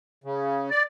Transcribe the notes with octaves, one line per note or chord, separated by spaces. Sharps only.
C#3
D5